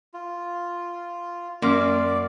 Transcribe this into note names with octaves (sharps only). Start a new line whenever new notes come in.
F4
F#2 A#3 D5 C6 F6